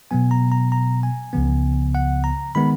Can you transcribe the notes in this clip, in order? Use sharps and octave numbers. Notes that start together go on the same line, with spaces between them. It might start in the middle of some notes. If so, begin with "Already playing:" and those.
B2 F#3 B3 G#5
A#5
A#5
A#5
G#5
C#2 C#3 F3 B3
F#5
A#5
D#3 G#3 B3 B5